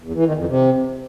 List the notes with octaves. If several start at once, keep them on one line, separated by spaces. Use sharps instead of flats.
E2
E3
D#3
F2
C3